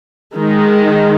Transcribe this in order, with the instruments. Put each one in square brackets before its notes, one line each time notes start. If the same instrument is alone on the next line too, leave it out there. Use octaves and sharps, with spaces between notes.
[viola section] D#3 G#3 D#4